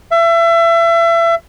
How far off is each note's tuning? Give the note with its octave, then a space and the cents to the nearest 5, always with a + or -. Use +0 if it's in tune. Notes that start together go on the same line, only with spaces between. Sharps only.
E5 +30